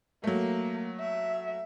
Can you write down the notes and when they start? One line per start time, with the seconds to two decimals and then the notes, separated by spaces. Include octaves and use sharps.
0.24 F#3 A3 A#3
1.00 E5